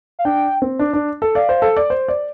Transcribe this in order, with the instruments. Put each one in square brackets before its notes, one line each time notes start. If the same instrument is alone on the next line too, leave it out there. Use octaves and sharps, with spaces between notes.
[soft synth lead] F5
[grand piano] D4 [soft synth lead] G5
[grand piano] C4
D4
D4
A4
[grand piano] D5 [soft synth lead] F5
[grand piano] C5
A4
D5
C5
D5